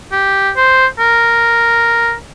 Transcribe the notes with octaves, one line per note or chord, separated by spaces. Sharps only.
G4
C5
A#4